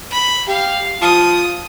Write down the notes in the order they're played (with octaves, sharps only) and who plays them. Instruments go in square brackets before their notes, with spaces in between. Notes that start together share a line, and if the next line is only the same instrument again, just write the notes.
[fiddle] B5
[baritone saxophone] G4 [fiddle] F5
[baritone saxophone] F3 [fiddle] D#6